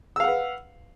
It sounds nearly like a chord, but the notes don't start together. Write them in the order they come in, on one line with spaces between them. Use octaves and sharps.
E6 F5 F#5 B4